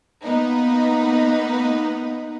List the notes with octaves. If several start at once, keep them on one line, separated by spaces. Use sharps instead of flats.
A#3 B3 D#4 B4